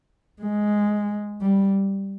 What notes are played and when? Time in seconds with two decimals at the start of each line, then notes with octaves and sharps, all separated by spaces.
0.42 G#3
1.41 G3